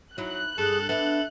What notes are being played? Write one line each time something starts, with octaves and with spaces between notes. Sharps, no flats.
F#3 D#4 E4 F#6
G2 G#4 A4
B3 D4 A4 E5